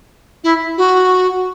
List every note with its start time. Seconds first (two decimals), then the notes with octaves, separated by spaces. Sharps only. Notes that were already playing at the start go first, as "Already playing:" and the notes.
0.43 E4
0.77 F#4